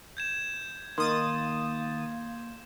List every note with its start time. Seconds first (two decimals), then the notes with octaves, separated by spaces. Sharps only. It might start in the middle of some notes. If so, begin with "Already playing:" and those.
0.17 G6 G#6 E7
0.98 D#3 A#3 C6 D#6 A6